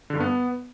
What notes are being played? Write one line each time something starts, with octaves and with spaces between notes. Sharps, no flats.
D3
G2
B3